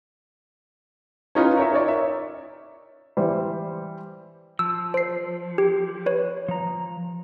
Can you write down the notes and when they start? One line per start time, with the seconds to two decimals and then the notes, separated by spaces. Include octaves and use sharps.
1.35 C#4 D#4 F4 B4
1.57 A#4 C#5 E5
1.73 D#4 C#5 D5
1.88 E5
3.17 E3 G3 C5
4.59 F3 E6
4.94 C5 C7
5.58 G4
6.06 B4 C#5
6.48 F3 A#5